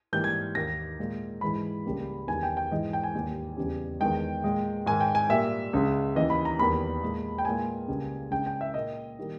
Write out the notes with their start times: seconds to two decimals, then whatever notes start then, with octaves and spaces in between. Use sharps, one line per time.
0.13 G#2 E3 G3 A#3 G6
0.24 G#6
0.55 D#2 D#3 A#3 A#6
0.99 A#2 G#3
1.41 G#2 E3 G#3 B5
1.85 C#2 C#3 G3 A#3
2.27 E2 D#3 G3 G#5
2.43 G5
2.57 G5
2.71 G#2 E3 G#3 D#5
2.93 G5
3.03 G#5
3.15 D#2 D#3 G3 A#3
3.57 E2 C#3 G3
4.00 E2 D#3 G#3 G5
4.44 A#2 G#3
4.86 G#2 D#3 G#3 G#5
5.00 G5
5.15 G#5
5.29 A#2 G3 A#3 E5
5.73 C#2 C#3 G#3
6.16 D#2 C#3 E3 D#5
6.30 B5
6.45 A#5
6.58 E2 D#3 G3 A#3 B5
7.02 A#2 G#3
7.38 G5
7.45 A#2 G#3 G#5
7.88 C#2 C#3 G3 A#3
8.31 C#2 C#3 G#3 G5
8.46 G5
8.61 E5
8.74 A#2 A#3 D#5
9.19 D#3 G3 A#3